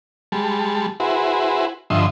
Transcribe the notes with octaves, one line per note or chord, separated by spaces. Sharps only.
G3 G#3 A5
E4 F#4 G#4 B4 C5
G2 D3 F3 D#5 E5 C6